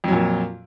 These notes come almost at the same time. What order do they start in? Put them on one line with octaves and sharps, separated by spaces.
F2 F#3 A#2